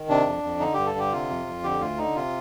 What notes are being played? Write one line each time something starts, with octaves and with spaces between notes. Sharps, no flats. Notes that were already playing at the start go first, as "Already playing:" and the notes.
Already playing: D#3
C3 D4
F2
F2
D3 D#4
G2 G4
A4
D3 G4
C3 F4
F2
F2
D3 G4
D2 F4
D3 D#4
C3 F4